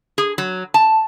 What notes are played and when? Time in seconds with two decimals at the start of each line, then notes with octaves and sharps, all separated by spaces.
0.18 G#4
0.38 F#3
0.74 A5